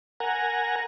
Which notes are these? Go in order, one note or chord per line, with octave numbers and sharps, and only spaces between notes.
A#4 F#5 G#5 A#5